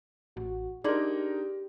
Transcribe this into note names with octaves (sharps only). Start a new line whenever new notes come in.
A1 F#4
D4 D#4 G4 G#4 A#4 D5 C6